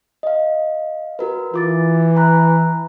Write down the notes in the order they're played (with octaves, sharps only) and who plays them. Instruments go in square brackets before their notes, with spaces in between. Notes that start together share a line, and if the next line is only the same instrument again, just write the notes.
[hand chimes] D#5 F5
F#4 A#4 B4
[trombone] E3 [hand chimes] F4 D6 A6
[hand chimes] A#5 B5 F#6